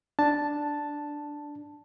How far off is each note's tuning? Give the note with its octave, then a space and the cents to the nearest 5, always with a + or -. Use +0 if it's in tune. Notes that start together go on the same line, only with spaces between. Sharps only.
D4 +0 A5 +0